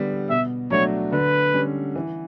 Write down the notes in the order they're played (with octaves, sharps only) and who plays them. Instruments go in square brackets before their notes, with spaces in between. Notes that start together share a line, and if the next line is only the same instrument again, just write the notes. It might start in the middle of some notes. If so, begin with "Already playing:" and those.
Already playing: [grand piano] D3 G3 B3
[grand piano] B2 [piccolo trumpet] E5
[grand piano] F#3 A3 D4 F#4 [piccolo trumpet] C#5
[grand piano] D3 [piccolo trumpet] B4
[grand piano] G3 C#4
E3